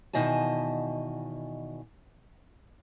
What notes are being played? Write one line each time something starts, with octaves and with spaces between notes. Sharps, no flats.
E2 B2 D#3 D#5 G#5 A5